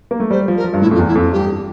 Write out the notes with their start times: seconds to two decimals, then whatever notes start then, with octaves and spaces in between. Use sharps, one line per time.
0.11 A#3
0.20 A3
0.31 G3 C5
0.48 F3
0.57 A#4
0.64 F3
0.73 G2
0.82 A2 E4
0.91 F2
0.94 F4
0.99 E2
1.07 E4
1.15 F2
1.32 G2 G4